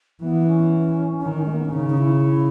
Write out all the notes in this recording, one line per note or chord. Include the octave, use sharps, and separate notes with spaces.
E3 B3
C#4
D#3
G#3
A#3
B3
C#4
C#3 D#4
D#4
E4